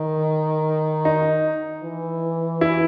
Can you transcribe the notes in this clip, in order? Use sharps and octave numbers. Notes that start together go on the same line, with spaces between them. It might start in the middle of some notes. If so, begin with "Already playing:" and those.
Already playing: D#3
D#4
E3
E4